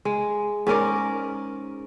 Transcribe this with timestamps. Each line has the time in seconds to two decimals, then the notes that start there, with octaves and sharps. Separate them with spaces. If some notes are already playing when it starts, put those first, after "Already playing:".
0.05 G#3
0.67 G#2 C#4 A#4 D5